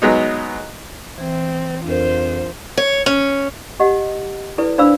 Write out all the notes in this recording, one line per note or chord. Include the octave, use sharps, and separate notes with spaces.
F#3 G#3 B3 D#4
E3 C4
F2 D4 F4 A#4 C5
C#5
C#4
G4 D#5 F#5
E4 A4 B4 D5
D4 C5 D5 F5 B5 E6